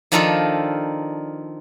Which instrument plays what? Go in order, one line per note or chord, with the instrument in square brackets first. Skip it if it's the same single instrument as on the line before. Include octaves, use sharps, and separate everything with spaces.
[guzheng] D#3 F3 D4 D#4 F4 A4